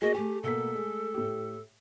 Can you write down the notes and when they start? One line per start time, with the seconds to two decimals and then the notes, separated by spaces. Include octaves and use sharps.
0.02 A#3 F#4 G#4 D#5
0.14 A3 G4 G#5
0.43 B2 A#3 A4 B6
0.75 G#3
1.14 A2 G4